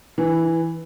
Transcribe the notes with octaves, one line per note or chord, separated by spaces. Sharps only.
E3